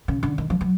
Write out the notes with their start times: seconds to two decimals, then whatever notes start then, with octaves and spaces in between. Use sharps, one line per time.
0.08 C#3
0.23 D3
0.38 D#3
0.50 F3
0.61 F#3